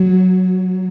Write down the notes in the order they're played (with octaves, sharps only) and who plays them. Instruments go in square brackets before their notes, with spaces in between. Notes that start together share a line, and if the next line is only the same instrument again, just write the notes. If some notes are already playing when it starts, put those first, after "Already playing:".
Already playing: [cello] F#3